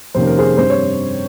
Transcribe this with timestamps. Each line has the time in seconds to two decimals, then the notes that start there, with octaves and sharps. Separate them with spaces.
0.15 F2 C3 D#3 A#3 C#4 C5
0.27 A#4
0.39 G#4 C5
0.58 G2 G3 C4 C5
0.70 C#5